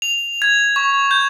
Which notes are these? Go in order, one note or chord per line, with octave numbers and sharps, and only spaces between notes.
F7
G#6
C#6
G6